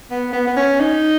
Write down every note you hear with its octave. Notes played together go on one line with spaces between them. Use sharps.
B3
B3
B3
C#4
D#4